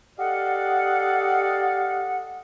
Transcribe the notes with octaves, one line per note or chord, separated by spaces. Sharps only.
G4 A4 D5 D#5 F5 F#5